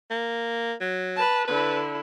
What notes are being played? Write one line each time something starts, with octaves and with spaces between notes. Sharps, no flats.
A#3
F#3
B4 A5
D3 E4 B4